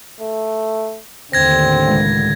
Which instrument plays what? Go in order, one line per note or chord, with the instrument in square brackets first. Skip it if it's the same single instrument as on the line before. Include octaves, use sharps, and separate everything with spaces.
[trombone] A3
[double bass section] D#2 A2 D3 [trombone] C4 [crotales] G#6 A#6
[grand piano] C#2